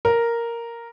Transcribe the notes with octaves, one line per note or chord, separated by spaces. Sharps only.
A#4